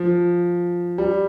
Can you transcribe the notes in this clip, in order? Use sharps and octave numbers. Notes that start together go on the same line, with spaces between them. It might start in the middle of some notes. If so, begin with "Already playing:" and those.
Already playing: F3
G3